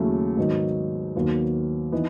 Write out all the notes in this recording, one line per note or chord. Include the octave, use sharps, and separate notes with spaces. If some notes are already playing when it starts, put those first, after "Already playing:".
Already playing: D#2 C#3 F#3 A3 E4
G#2 D#3 F#3 B3 D#4
D#2 D#3 F#3 B3
E3 B3 D#4